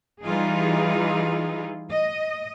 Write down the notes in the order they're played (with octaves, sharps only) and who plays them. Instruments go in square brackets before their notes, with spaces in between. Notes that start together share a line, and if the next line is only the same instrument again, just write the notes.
[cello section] E3 G3 D#4 F4 G#4
D#5